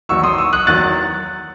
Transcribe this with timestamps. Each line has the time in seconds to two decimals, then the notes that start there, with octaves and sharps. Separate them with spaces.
0.09 E2 D#3 F#3 C#6 E6
0.23 C6 D#6
0.38 C#6 E6
0.53 D#6 F#6
0.67 E2 D#3 F#3 F#6 A6